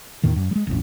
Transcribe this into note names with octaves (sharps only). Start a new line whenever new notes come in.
D#2 A2 D#3
F#2
G3 G#3
E1 A1